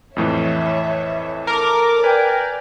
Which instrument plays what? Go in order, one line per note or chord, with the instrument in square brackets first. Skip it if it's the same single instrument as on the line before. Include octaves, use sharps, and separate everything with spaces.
[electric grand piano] F2 A2 E3 [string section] C#5 E5
[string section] A4 D6 [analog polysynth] A#4
[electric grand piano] B4 [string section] D5 [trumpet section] G5 G#5